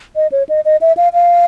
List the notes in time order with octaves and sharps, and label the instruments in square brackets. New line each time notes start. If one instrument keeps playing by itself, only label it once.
[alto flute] D#5
C#5
D#5
D#5
E5
F5
F5